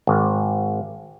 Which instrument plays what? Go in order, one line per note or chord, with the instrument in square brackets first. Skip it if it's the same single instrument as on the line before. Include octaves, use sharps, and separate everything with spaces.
[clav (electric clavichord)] G#1